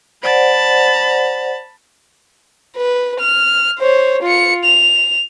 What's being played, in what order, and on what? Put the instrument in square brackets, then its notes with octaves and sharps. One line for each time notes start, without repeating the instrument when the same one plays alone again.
[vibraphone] C5 D5 F#5 [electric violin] A5 B5
[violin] B4
F6
C5 C#5
F4 C#7
F7